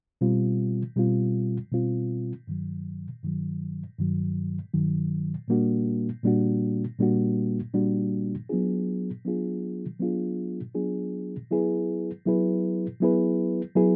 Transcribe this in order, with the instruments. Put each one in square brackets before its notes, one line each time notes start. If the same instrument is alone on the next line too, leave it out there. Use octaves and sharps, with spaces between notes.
[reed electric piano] B2 G3 C4 F4
B2 G3 C4 F4
B2 G3 C4 F4
G2 D#3 F#3
G2 D#3 F#3
G2 D#3 F#3
G2 D#3 F#3
A#2 G3 A#3 D4 F#4
A#2 G3 A#3 D4 F#4
A#2 G3 A#3 D4 F#4
A#2 G3 A#3 D4 F#4
F#3 B3 D4 F4 G#4
F#3 B3 D4 F4 G#4
F#3 B3 D4 F4 G#4
F#3 B3 D4 F4 G#4
F#3 B3 E4 G#4 B4
F#3 B3 E4 G#4 B4
F#3 B3 E4 G#4 B4
F#3 B3 E4 G#4 B4